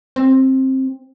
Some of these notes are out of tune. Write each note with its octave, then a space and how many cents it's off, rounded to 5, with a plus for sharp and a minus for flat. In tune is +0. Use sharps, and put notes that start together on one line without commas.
C4 +15